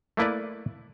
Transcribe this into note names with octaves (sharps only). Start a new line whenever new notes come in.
A3 A#3 E4 B4 D5